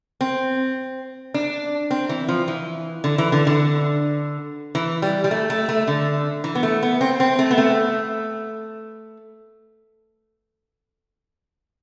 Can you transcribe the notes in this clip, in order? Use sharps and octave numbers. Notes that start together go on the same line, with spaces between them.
C4
D4
C4
E3
F3
E3
D3
E3
D3
D3
E3
G3
G3
A3
A3
A3
D3
E3
B3
A3
B3
C4
C4
A3
B3
A3